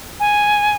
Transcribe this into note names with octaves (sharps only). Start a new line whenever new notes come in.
G#5